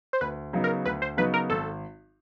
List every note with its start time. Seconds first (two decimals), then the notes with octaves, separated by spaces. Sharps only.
0.13 C5
0.21 D2 B4
0.53 C#3 F#3 B3 D#4
0.64 A#4
0.85 D2 B4
1.02 C5
1.17 C#3 F#3 B3 D#4 B4
1.34 A#4
1.50 G#1 A4